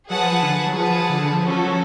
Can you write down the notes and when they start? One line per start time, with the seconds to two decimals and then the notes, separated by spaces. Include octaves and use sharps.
0.10 F#3 G#4 B4 F#5 A5
0.21 F3
0.32 F3
0.43 D3
0.66 F#3
0.76 F3 G#4 B4 F#5 A5
1.10 D3
1.21 D3
1.32 F3
1.43 F3 C#4 F#4 A4
1.54 F3
1.65 F#3